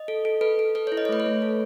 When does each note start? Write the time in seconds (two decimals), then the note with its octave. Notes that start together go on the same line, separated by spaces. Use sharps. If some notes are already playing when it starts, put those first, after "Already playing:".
Already playing: D#5
0.08 A4
0.25 A4
0.41 A4 B4
0.59 A4
0.75 A4 B4
0.87 E4 C#5
0.97 D#5
1.05 C#5
1.09 A3 B4
1.20 C#5
1.26 A3
1.42 A4